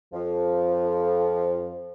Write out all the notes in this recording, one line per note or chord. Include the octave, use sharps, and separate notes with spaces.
F2 F3